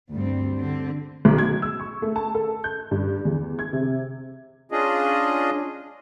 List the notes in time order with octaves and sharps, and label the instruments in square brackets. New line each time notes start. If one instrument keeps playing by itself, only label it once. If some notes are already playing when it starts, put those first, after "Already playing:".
[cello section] D2 G2 G3 C4
D3 C4
[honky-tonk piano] B1
G#6
E6
C#6
A3
A5
A4
G6
G2
E2
G#6
C3
[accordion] C#4 D4 F4 G#4 D#5